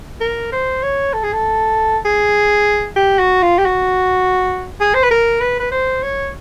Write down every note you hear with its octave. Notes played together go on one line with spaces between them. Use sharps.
A#4
C5
C#5
A4
G#4
A4
G#4
G4
F#4
F4
G4
F#4
G#4
C5
B4
A#4
B4
B4
C5
C#5